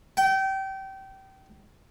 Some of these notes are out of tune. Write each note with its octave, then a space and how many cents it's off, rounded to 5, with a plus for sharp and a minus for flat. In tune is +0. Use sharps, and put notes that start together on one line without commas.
G5 -25